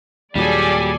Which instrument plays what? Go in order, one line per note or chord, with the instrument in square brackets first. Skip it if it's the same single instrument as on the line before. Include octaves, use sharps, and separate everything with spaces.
[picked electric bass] D#2 A#2 F#3 [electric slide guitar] G3 [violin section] G#4 A4 G#5 [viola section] D5